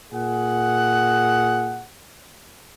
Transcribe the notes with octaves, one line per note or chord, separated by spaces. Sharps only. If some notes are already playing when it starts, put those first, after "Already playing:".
A#2 G#4 F#5